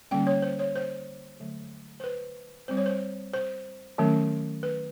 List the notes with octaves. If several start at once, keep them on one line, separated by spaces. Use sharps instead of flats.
D3 G3 A#3 C#4 G5
C#5
C5
C#5
C5
D3 F#3 A3
C5
B4
G3 C4 C5
C#5
C5
C5
D#3 F#3 A3 C#4
B4